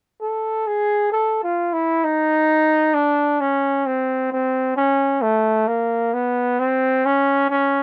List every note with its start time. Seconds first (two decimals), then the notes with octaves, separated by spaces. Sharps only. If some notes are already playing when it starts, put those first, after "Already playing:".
0.21 A4
0.67 G#4
1.12 A4
1.43 F4
1.73 E4
2.04 D#4
2.94 D4
3.41 C#4
3.86 C4
4.32 C4
4.77 C#4
5.22 A3
5.68 A#3
6.14 B3
6.60 C4
7.05 C#4
7.50 C#4